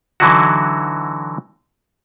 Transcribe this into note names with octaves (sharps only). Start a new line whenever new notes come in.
D3 E3 F#3 D#4 E4 F#4